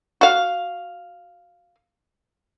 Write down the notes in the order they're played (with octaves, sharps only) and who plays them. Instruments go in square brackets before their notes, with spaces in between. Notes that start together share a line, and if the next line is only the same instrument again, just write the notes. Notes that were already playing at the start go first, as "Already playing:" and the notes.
[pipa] F#4 F5